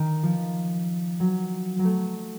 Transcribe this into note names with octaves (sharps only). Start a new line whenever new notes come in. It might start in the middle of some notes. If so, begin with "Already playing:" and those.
Already playing: D#3
F3
F#3
F#3
A3